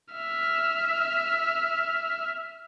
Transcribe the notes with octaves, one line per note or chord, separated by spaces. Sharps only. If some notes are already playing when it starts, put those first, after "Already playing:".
E5 F6